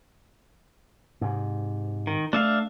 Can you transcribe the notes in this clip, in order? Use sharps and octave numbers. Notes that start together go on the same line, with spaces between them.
G#2 C3
D#3
A3 D4 E5 F5